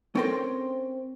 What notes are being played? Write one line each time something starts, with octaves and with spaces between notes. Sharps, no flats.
C4 C#4 A4 A#4 G5 C6